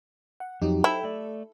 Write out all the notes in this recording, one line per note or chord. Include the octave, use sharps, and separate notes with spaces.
F#5
F2 F#3 D#4 G4
E4 A4 C5 G5
A3 D5